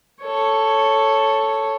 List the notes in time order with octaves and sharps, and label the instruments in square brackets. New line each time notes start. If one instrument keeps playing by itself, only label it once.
[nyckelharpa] A4 C#5